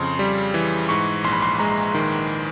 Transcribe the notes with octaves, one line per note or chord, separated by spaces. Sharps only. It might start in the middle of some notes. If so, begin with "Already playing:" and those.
Already playing: F2 C#3 C6
G3
E3
G#2 C#6
A#1 C6
B5
C6
G#3 A#5
D#3